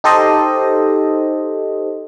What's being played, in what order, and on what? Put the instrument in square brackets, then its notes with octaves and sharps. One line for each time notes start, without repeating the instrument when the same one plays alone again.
[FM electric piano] D#4 G4 A4 C5 D#5